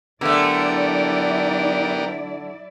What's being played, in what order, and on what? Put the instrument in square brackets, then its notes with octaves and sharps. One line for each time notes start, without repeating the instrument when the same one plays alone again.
[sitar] D3 A3 [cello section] F#3 E4 D5 [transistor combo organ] B3 G4 A#4